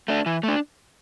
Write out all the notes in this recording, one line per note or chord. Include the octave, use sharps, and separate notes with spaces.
A3 D4
E3
A3 D4